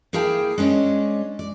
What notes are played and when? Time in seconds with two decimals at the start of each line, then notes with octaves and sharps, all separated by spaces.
0.13 A#3 E4 G#4 F5 G5 A5
0.58 G#3 C#4 D4 C#5 D#5
1.39 D5